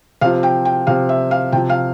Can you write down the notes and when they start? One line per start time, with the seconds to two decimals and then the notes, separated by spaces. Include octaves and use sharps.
0.21 C3 F3 F5
0.43 G5
0.65 G5
0.87 C3 F3 F5
1.09 E5
1.31 F5
1.52 C3 G5
1.56 F3
1.70 F5